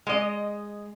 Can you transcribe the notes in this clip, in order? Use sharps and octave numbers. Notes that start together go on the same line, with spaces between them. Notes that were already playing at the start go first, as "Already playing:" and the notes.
G#3 D#5